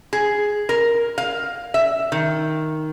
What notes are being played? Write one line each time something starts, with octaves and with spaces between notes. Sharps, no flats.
G#4
A#4
F5
E5
D#3